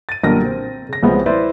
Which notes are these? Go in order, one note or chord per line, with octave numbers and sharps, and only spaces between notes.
A6 D#7
B1 A#2 D3 G3 A#4 A#6
C4
C#3 A#6
C2 C#3 F3 G#3 B3 C4
E4 B4 C5 D5 E5 C6